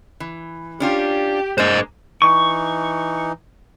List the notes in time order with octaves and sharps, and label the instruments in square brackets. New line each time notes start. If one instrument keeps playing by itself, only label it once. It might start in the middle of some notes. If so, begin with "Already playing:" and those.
[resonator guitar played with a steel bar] E3
[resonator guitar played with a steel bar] C#4 D4 F4 [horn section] G4
[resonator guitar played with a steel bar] G#3 A#3 D4 [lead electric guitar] C5 D#5
[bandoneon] E3 D#4 [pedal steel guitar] C#6